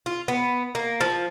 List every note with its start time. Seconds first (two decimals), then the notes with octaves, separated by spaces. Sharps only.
0.06 F4
0.28 B3
0.75 A#3
1.01 F3